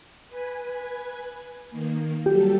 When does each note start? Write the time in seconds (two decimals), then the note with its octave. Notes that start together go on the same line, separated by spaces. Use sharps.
0.27 B4 G#5
1.71 D#3 A#3
2.26 F#3 G3 G4 A4